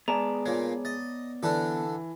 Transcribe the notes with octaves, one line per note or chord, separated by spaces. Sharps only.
G#3 B3 G#4 D5 A5 A#5
A#2 A#3 C#5
D#5 A6
D3 E3 D4 A4